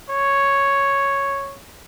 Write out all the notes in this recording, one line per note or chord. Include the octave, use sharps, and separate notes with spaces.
C#5